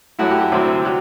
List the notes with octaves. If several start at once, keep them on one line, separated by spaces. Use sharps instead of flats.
F#2 F#3 A3 E4 F#4
G4
G4
D2 C3 F#3 C4 E4
F#3